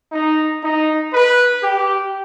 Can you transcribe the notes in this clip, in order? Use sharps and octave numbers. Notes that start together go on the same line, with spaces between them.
D#4
D#4
B4
G4